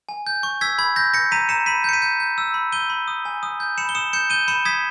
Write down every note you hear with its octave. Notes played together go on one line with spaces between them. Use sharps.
G#5
G6
C#6
E6 G#6 B6
B5 G#6
G6 A#6
G6 A#6 C#7
A#5 B6 D#7
A#5 C#7 E7
B5 B6 D#7
G6 C#7
B6 D#7
G6
G6
E6
B5
G6 D#7 G7
B5
D#6
G#5
D#6
G6
B5 C#7 E7
G7
D#6 C#7 E7
G6 C#7 E7
G6 D#7 G7
B5 C#7 E7
D#6 G#6 B6